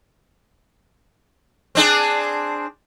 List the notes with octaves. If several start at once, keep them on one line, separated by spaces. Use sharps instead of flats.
C4 D4 G#4